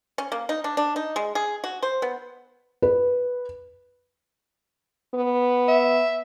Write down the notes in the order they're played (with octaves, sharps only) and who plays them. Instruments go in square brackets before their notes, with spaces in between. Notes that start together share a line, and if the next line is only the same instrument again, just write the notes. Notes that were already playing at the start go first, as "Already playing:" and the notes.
[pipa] C#4
A#3
D#4
D4
D4
D#4
G#3
G#4
F#4
C5
B3
[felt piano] B4
[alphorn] B3
[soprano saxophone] E5